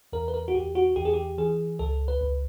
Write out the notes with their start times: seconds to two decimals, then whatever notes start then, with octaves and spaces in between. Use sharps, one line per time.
0.13 E2 A#4
0.28 B4
0.34 A#4
0.48 F#4
0.54 E2 G4
0.75 F#4
0.96 E2 G4
1.05 G#4
1.13 G4
1.38 E3 G#4
1.79 C#2 A4
2.08 B4
2.21 C#2